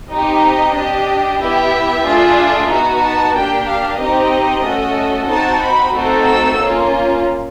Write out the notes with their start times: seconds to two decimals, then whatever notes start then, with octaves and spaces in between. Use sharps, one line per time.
0.10 C4 D#4 G4 D#5
0.76 D4 G4
1.39 B3 E4 G4 E5
2.04 A3 D4 F4 G#4
2.69 B3 D#4 F#4
3.02 A5
3.35 A#3 D4 G4 G5
3.67 F5
3.99 C4 D#4 G4 D#5
4.65 A3 C#4 F#4 A4
5.29 C4 D#4 F#4 A5
5.62 B5
5.94 A3 C4 D#4 F#4 A4
6.26 E6
6.59 A#3 C#4 F4